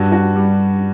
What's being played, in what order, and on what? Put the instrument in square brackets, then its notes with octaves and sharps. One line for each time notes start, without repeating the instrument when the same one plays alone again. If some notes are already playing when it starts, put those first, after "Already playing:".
Already playing: [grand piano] G2 [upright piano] F#4
[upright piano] F#4
G3